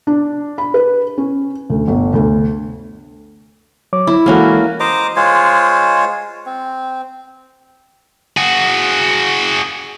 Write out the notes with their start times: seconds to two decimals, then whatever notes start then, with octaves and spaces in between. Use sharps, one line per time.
0.07 D4
0.58 B5
0.74 B4
1.18 C#4
1.70 D2
1.88 G1
2.14 D2
3.93 F#3 C#5 D6
4.07 E4
4.26 E3 G#3 A#3 C#4 F#4 A4
4.80 C5 D#5 A#5 D6
5.16 G#3 F4 C5 C#5
6.46 C4
8.37 F#4 G#4